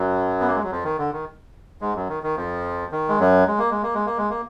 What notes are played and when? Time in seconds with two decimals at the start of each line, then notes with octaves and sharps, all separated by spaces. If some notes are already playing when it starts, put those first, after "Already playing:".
Already playing: F#2 F#3
0.40 B3
0.48 A#3
0.55 G#3
0.63 F#3
0.71 F2 F3
0.84 D#3
0.98 D3
1.12 D#3
1.81 G#2 G#3
1.95 F#2 F#3
2.09 D#3
2.23 D#3
2.37 F2 F3
2.92 D#3
3.09 G#3
3.19 F#2 F#3
3.47 G#3
3.58 A#3
3.71 G#3
3.83 A#3
3.94 G#3
4.06 A#3
4.18 G#3
4.30 A#3